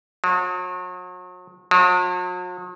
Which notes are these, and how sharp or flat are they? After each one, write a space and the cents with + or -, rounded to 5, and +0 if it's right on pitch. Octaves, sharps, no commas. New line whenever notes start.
F#3 -40
F#3 -45